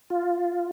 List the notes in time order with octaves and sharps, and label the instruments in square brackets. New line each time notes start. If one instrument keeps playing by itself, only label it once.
[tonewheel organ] F4